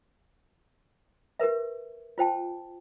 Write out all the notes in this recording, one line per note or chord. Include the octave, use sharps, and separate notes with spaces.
G4 A#4 B4 E5
F4 C5 G5 A5